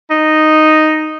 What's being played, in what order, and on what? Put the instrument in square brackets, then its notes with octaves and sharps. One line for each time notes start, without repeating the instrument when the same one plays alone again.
[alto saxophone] D#4